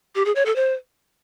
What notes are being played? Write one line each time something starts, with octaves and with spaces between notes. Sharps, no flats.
G4
G#4
C#5
A4
C5